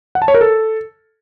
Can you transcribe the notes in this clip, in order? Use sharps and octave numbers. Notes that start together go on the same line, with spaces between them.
F#5
A5
C#5
A#4
A4